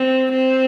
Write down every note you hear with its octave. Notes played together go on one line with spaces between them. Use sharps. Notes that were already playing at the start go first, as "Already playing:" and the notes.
Already playing: C4
C4